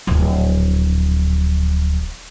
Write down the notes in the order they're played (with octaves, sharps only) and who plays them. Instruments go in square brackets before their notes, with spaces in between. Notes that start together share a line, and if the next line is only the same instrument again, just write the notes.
[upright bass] D1 A#1